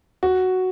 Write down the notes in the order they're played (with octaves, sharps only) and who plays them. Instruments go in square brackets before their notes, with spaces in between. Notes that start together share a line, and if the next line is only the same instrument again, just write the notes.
[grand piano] F#4